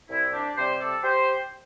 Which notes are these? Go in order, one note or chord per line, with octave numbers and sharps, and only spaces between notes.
C2 E4
D4 G4
C3 G3 G4 C5
A4 D5
G4 C5